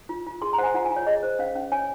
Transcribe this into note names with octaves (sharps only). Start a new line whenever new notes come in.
F4
F4
G#4 C6
A#5
C5 F#5 G#5
F4 F#5
G#5
F4
C#5
G#4 D#5
C5
C#4 F5
C#4
C#5 G#5